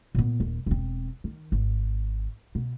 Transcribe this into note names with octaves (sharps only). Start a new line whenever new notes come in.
A#2 B3
D#1
E1 C4
D#3
G#1
B2